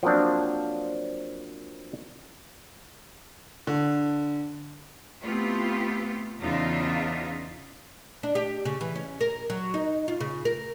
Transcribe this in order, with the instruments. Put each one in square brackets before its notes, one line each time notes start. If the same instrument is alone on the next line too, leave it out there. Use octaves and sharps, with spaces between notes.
[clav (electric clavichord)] F3 F#3 A#3 C4 D4
[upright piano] D3
[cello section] A3 B3 C4 E4 F4 G4
E2 C#3 D4 D#4 F4 E5
[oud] D4
G4
C#3
E3
C#4
A#4
F#3
D#4
F4
C#3
A#4